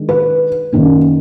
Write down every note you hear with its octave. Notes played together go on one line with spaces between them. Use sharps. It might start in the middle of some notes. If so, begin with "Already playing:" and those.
Already playing: D#3 G#3 D4
B4
F#2 D#3 A#3